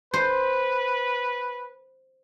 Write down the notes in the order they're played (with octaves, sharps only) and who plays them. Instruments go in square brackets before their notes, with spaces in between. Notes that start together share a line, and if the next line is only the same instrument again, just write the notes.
[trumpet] B4 [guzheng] C5